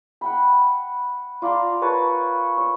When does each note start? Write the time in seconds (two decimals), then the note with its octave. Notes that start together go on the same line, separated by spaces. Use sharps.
0.21 F#5 G5 B5
1.42 F4 D5 A#5 C6
1.82 A#4 B4 C#5 A5
2.57 C#5